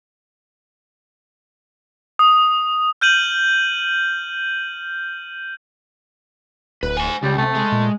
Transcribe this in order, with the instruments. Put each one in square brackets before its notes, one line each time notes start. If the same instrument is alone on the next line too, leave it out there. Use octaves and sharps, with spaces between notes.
[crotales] D#6
F6 G6 D#7 F#7
[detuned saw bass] D1 [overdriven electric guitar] B4
[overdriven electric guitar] C5 G#5
[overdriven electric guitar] C#2 [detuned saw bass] C#3 [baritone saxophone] G3
[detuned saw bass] C3 [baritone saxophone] A3
[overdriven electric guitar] G#3
[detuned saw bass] A#2